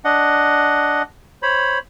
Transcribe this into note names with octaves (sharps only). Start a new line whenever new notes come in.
D4 D#5 F#5
C5 C#5 B5